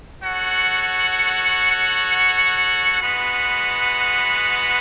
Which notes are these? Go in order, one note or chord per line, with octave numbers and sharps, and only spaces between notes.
F#4 A4 C#5 F#5
G#3 B3 F#4 B4 F#5